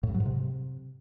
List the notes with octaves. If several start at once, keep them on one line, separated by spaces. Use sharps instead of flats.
A2
G2
F#3
G#2
C3